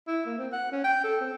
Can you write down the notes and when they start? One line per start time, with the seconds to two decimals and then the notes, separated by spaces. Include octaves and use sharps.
0.08 E4
0.26 A#3
0.39 C4
0.52 F#5
0.72 C#4
0.84 G5
1.04 A4
1.21 C4